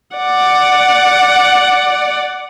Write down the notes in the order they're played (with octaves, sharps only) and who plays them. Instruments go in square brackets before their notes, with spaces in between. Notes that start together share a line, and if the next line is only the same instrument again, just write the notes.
[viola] D5 F#5